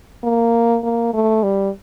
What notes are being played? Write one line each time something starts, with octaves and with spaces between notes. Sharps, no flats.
A#3
A#3
A3
G3